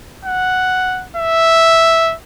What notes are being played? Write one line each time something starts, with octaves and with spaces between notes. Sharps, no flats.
F#5
E5